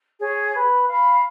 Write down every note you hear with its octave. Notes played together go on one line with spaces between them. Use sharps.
G#4 C#5
B4
F5 B5